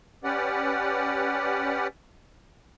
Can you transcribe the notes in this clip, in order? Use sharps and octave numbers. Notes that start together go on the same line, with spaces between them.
C#4 G4 B4 D5 F#5